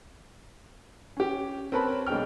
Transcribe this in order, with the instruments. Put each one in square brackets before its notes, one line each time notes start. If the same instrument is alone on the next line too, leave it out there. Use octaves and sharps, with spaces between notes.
[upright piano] C#4 G4
C4 A#4 B4 C#5 A5 B5
B1 G#3 D4 G5 F6